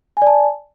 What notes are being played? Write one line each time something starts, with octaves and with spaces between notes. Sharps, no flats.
D5 G#5 A5